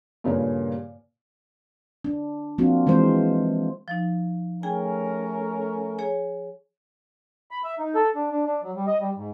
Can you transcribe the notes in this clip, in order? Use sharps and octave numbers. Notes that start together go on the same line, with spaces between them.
G2 A#2 C#3 A#3
D4
F3 A#3 C4 D4 F4 F#4
E3 G#3 C4 C5
F3 D#4
A3 C#4 G#4 A#4 G5 G#5
G#4 C#5 G#5
B5
E5
D#4
A4
D4
D4
D4
F#3
G3
D#5
G3
G#2